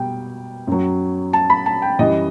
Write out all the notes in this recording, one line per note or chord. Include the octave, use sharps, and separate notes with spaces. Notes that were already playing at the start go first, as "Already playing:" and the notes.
Already playing: B2 G3 G5
F#2 F#3
A5
B5
A5
G5
F#2 E3 G3 D#5